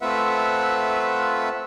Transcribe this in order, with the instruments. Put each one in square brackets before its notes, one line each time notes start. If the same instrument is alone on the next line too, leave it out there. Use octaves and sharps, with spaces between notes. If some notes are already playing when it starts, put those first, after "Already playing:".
[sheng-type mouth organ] A3 C4 F4 B4 E5 F#5